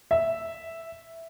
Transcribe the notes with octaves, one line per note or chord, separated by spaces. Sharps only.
E5